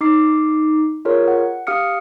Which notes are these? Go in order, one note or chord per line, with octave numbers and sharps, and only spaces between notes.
D#4 D6 C7
F4 G#4 A#4 C#5
F#5
G4 F5 D#6 F6 C#7